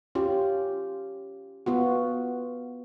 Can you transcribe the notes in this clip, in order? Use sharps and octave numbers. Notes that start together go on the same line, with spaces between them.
C#4 F4 G4
B3 F4 F#4